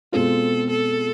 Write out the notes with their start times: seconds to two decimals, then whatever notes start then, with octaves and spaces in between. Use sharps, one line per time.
0.12 B2 G#3 C4 F4 A4
0.70 A4